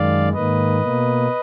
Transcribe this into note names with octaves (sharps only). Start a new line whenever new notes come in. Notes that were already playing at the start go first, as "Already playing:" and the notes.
Already playing: F#2 D#3 G#3 D5 F5
G#2 D#3 A#3 B4 D#5
B2 A#3